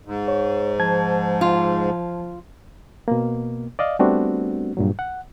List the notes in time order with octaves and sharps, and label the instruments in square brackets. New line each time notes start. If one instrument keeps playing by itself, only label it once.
[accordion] G#2
[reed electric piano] C#5
[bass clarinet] F3 [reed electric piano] A5 G#6
[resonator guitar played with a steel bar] F4
[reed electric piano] B2 A#3
D5 D#5 F5
G3 A3 B3 C4 D4 F#4
G2 A#2 F#3
F#5